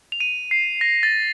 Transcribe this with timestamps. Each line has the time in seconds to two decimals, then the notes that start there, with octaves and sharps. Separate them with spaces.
0.12 F7
0.20 D#7
0.51 C7
0.81 A#6
1.03 A6